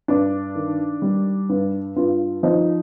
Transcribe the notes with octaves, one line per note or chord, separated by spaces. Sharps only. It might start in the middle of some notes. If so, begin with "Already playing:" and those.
G2 D4
D#3
G3
G2
G2 F4
F3 D#4